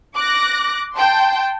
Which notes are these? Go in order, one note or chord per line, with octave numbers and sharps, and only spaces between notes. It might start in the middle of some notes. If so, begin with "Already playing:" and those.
D6 F#6 A#6
G5 A5 C6